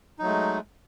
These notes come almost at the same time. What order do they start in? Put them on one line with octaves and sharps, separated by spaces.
D#4 F#3 A3 G#3